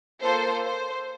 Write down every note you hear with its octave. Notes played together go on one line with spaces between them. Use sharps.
A#3 F4 A4 C5
C5